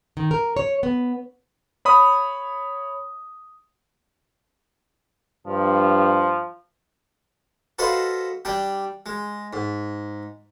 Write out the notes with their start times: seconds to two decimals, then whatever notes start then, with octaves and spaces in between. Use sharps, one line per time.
0.17 D#3
0.31 A#4
0.57 C#5
0.83 B3
1.85 C#5 B5 D#6
5.47 G2 F3
7.79 F#4 A4 B4 C5 D#5 F5
8.45 G3 D4 G5
9.06 G#3
9.53 G#2